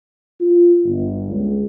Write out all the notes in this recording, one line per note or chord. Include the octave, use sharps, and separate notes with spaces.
F4
G1
C#2